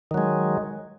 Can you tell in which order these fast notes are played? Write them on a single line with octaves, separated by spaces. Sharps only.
D#3 F#3 G#3